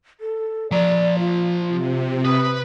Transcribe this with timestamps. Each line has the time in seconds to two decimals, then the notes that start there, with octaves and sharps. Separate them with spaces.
0.20 A4
0.71 F3 D5 A#5
1.19 F4
1.68 C3 F4
2.25 B4 D#6